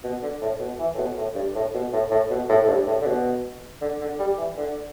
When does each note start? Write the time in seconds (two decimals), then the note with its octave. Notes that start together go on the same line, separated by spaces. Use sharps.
0.04 B2
0.22 D3
0.41 A2
0.60 B2
0.79 E3
0.94 A2
0.98 B2
1.17 A2
1.35 G2
1.55 A2
1.74 B2
1.92 A2
2.11 A2
2.30 B2
2.49 A2
2.62 A2
2.68 G2
2.87 A2
3.01 D3
3.06 B2
3.81 D3
4.00 D3
4.19 G3
4.38 E3
4.57 D3